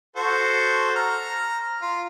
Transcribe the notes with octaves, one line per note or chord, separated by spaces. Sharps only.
F#4 A4 C5
A#5 F6
F4